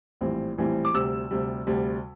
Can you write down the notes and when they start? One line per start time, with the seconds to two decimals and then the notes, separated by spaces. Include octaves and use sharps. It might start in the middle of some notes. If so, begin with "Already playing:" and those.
0.21 A#1 A2 E3 G3 C4
0.58 A#1 A2 E3 G3 C4
0.85 D6
0.94 D2 C3 G3 E6
1.31 D2 C3 G3
1.67 D2 C3 G3